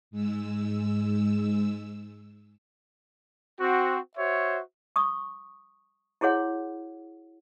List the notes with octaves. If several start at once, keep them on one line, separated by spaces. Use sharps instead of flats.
G#2 G#3 E6
C4 F#4
F#4 C5 C#5 E5
C#6 D#6
E4 F#4 G#4 C#5 F#5